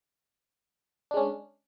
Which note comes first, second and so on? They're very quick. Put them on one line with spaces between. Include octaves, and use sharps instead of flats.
D4 G#3 C#4